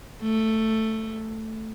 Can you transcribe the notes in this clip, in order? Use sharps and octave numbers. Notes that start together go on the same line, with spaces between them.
A3